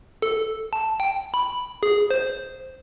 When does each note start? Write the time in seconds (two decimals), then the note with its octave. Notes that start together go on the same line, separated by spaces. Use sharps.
0.22 A4
0.73 A5
1.00 G5
1.34 B5
1.83 G#4
2.10 C5